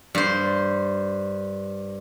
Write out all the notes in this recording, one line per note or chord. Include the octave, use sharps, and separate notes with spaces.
G2 C5